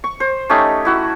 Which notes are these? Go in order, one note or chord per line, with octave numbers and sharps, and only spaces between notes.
C#6
C5
A3 C#4 D#4 G4
E4 F#4